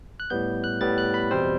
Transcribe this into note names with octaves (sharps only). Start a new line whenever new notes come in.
F#6
A2 G3 B3 G6
F#6
A2 G3 B3 A6
F#6
B5
E2 B2 G3 C4 C5